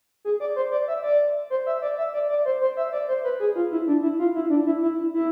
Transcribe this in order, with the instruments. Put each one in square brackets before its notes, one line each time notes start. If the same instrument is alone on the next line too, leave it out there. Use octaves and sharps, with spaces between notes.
[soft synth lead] G#4
D5
C5
D5
E5
D5
C5
E5
D5
E5
D5
D5
C5
C5
E5
D5
C5
B4
G#4
F4
E4
D4
E4
F4
E4
D4
E4
E4
E4